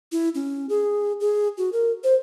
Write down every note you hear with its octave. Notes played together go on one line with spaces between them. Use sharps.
E4
C#4
G#4
G#4
F#4
A#4
C5